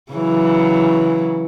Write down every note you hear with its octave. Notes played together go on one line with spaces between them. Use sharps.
C#3 E3 F#3